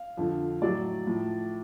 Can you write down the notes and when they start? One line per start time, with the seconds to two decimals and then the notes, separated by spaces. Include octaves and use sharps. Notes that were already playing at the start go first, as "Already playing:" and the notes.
Already playing: F5
0.17 F2 D3 F3
0.62 A2 F#3 D5
1.07 A2 F3